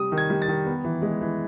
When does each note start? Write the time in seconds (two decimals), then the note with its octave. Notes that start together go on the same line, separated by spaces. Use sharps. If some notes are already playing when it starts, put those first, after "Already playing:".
Already playing: C3 G3 D#6
0.12 D#3
0.17 G#6
0.30 G3
0.42 A6
0.48 D#3
0.66 B3
0.84 E3
1.02 G#3
1.21 E3